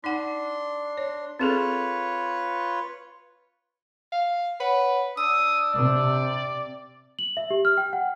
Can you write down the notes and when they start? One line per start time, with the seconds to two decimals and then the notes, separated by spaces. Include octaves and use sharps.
0.04 D4 D#4 F#5 C6
0.97 C#5
1.39 C4 F4 G#4 A4 B4 C#5
4.12 F5
4.60 B4 C#5 F#5
5.17 D4 D#6 E6
5.73 C3 D5
7.19 F#7
7.37 E5
7.50 G4
7.65 F6
7.78 G5
7.93 F#5